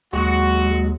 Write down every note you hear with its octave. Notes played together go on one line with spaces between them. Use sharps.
D#2 F#3 G#3 F#4